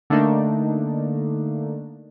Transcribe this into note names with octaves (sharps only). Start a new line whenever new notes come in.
D3 A3 A#3 D4 D#4